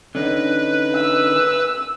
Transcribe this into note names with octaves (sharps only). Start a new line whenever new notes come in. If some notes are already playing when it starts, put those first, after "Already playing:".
D3 C#4 D#4 B4
E6